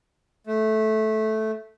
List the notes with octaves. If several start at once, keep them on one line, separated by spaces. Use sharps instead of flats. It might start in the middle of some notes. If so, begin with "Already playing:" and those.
A3